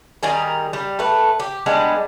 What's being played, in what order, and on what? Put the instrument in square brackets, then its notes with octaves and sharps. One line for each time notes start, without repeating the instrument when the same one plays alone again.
[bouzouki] D#3 G3 G#4 A#4
G3
A3 B4
G4
G3 G#3 B3 D4